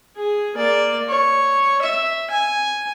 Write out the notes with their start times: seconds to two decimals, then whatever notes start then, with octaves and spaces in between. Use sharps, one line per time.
0.16 G#4
0.55 A#3 D5
1.09 C#5
1.82 E5
2.30 G#5